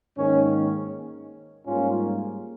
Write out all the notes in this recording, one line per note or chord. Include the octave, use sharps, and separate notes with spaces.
G#2 D#3 A#3 C#4
G#2 G3 A#3 C#4 F4